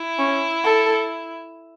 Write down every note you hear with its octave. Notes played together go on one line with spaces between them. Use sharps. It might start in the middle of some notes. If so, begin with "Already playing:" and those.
Already playing: E4
C#4
A4